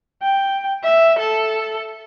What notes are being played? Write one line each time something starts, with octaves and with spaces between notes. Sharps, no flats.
G5
E5
A4